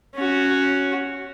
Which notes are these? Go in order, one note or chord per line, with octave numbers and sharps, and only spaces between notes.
C#4 F#4